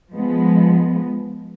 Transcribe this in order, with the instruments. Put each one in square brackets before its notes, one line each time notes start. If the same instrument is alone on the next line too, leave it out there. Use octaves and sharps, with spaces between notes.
[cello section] F3 G#3 B3